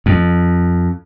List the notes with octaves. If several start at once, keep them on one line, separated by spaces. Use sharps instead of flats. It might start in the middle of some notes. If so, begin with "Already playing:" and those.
F2